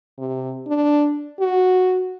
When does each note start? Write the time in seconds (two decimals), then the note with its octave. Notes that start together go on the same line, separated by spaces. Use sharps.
0.18 C3
0.68 D4
1.40 F#4